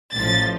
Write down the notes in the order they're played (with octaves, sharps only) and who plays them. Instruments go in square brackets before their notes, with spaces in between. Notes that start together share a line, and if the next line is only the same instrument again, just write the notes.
[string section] A1 A2 F3 A6